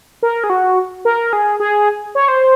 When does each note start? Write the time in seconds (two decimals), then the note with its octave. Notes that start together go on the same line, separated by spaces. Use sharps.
0.23 A#4
0.44 G#4
0.50 F#4
1.05 A#4
1.33 G#4
1.60 G#4
2.15 C#5
2.28 C5